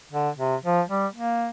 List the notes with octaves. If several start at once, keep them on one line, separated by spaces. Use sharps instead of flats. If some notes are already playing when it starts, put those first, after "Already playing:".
D3
C3
F3
G3
A#3